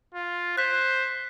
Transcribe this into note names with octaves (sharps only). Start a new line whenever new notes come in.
F4
C5 F#6 B6